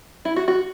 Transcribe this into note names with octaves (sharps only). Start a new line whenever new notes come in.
E4
F#4
F#4